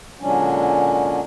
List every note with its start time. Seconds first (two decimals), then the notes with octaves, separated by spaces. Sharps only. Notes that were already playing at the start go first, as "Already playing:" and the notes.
0.20 A#2 D3 F#3 G#3 C#4 D4